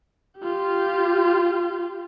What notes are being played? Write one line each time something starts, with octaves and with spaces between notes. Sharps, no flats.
F4 G4